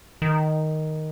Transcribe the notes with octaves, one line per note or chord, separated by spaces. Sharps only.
D#3